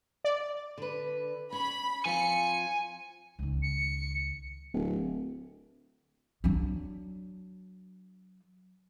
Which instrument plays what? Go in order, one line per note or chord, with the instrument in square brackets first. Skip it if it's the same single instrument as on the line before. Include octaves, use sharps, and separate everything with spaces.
[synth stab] D5
[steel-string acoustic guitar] D3 B4
[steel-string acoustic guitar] C#4 [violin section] B5
[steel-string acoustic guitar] F3 C4 F4 [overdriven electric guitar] G#5 [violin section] C#7
[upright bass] C#2 D#3
[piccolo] C#7
[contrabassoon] D1
[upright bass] F#3 D4